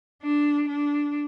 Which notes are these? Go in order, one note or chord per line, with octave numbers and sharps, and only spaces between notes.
D4
D4